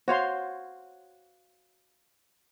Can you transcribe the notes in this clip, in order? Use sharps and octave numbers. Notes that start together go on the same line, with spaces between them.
F#4 C5 C#5 F5 C6